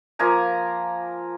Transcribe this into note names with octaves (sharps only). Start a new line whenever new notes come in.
F3 A#3 G#5 A#5